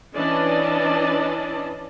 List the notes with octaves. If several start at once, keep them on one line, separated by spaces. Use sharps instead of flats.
E3 C#4 D4 D5 D#5 A5